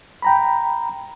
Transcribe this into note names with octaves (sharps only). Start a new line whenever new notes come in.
G5 A#5 B5